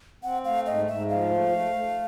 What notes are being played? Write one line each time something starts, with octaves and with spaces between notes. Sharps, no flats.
C4 F#5
A3 F5
G#2 D#5
G#2 E5
F3 F5
A3
A3
A3